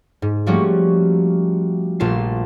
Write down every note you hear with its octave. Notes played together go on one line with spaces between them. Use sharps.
G#2
F3 G3 A3 A#3 C#4 F#4
A#1 A#2 A3 F4 A5 C7